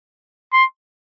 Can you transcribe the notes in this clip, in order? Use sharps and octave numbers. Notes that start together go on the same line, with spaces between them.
C6